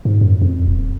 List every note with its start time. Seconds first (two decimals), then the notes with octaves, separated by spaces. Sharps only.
0.05 G#2
0.21 F#2
0.42 F2
0.67 D#1